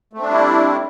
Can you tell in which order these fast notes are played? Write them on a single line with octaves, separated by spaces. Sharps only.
A3 C4 D4 G3 E4